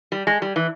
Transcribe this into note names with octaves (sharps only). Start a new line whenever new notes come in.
G3
G#3
G3
E3